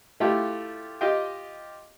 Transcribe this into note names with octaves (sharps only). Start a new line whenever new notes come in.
A3 E4 F4 G4
F4 G4 D#5 F5 G5